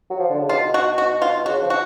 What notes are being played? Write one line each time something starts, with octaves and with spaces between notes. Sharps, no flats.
F#3
F3
D3
C#3
B2 F4
F#4
F#4
F4
C#3 F#4
F3
F#4